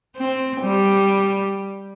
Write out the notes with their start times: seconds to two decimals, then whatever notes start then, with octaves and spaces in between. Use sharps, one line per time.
0.16 C4
0.62 G3